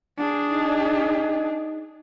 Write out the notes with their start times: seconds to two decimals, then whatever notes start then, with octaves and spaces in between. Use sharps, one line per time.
0.18 D4 G#4
0.50 D#4